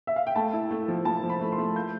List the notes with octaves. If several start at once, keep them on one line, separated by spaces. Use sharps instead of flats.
E5
F5
G5
A3 A5
E4
A3
F3
F3 A5
F3
B5
A3
C6
A3
F4 G6